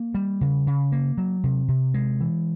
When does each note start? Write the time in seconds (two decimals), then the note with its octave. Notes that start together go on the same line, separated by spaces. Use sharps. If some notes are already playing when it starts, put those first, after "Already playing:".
Already playing: A#3
0.15 G3
0.41 C#3
0.67 C#3
0.92 A#3
1.18 F#3
1.44 C3
1.68 C3
1.94 G#3
2.21 E3